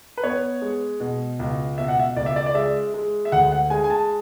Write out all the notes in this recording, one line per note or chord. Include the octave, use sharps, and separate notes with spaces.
B4
B3 C#5
G#3
B2
C#2
B2 E5
F#5
E5
C#2 D5
E5
D5
D5
G#3 E5
G#3
E5
D2 F#5
F#5
G#3 G#5
G#5
A5